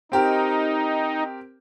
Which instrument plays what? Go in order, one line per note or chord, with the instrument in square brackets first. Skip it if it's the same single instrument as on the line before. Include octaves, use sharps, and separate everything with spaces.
[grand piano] C4 G4 A#4 [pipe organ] D#4